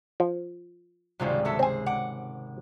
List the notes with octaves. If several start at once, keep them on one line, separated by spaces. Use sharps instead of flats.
F3
G#1 C#2 C3 F#3 G3 F4
F#3 A4 E5
C4 G#4 C5 G#5
F#5 D6